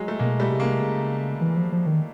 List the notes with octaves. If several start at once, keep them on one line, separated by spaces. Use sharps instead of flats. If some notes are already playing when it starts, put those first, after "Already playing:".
Already playing: F#3 G#3
A3
B2 G#3 A#3
G3 A3
C3
G#3 A#3
C#3
E3
F3
F3
D#3